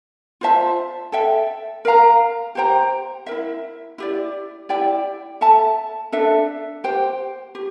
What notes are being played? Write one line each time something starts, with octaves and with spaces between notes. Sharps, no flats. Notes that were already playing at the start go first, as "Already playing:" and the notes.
F4 C5 E5 A5
A4 E5 G5
A#4 F5 A#5
G4 C5 G5 A#5
E4 A#4 E5
E4 G4 D5
E4 G4 D5 G5
A4 E5 A5
D4 A4 E5
G4 C5 G5
G4